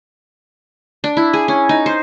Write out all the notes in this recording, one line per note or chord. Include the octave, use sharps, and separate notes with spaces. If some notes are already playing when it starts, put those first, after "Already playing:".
D4
E4
G#4
C#4
D#4
C5